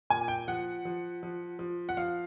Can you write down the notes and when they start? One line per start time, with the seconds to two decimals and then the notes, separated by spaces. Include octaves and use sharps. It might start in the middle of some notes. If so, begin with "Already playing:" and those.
0.10 A#2 G#5
0.28 G5
0.48 F3 F#5
0.85 F3
1.23 F3
1.59 F3
1.89 F#5
1.97 F3 F5